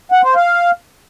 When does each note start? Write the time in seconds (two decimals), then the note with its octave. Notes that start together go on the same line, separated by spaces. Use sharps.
0.12 F#5
0.24 C5
0.35 F5